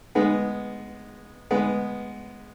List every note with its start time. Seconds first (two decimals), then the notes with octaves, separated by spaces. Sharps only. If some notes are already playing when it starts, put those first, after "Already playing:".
0.15 G#3 B3
1.51 G#3 B3